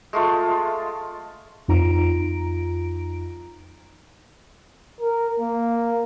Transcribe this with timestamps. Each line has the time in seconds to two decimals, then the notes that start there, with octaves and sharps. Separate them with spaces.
0.13 G#3 A3 F4
1.68 F2 D#4 F4 A#5 D7
5.00 A#4
5.40 A#3